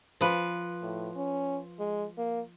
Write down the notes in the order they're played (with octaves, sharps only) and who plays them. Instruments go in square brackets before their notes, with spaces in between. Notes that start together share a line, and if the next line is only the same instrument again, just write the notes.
[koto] F3 B4
[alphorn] A2
C#4
G#3
A#3